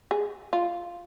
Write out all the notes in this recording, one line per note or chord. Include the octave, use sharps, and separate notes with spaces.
G#4
F4